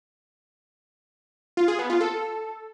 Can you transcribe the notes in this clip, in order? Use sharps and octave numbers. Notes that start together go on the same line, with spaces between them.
F4
G#4
B3
F4
A4